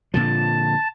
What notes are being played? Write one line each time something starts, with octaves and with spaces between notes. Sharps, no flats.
A#2 D3 F3 A5